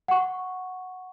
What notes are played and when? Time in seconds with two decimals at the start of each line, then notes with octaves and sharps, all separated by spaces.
0.08 F#5 C#6